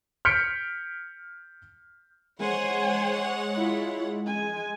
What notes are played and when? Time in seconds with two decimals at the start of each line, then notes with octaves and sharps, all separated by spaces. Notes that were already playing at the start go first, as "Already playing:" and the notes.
0.25 F6 G6 B6 C#7 D7
2.40 G#3 C5 C#5 F#5 G#5
3.55 E4 F4
4.27 G#5